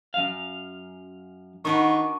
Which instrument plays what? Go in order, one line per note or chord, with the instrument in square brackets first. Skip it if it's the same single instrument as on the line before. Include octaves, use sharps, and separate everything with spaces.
[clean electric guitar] F#2 F5
[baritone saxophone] D#3 [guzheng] D4 F#4 B4 [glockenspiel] C#6